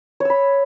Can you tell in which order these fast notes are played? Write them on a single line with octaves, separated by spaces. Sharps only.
C#5 E6 B5